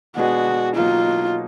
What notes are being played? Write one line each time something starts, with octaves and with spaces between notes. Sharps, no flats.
B2 G#3 B3 D4 F#4 G#4
B2 F#3 A#3 D#4 F4